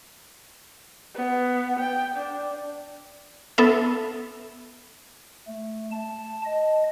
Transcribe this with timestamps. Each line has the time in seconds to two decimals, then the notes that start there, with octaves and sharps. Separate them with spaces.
1.14 B3
1.79 G5
2.16 D4
3.58 B3 A4 E5
5.48 A3
5.92 A5
6.45 D#5